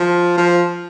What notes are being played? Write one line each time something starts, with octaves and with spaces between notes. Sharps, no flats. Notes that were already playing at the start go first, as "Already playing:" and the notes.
Already playing: F3
F3